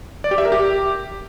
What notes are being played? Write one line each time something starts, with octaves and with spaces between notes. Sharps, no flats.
D5
G4
E5
A#4
G4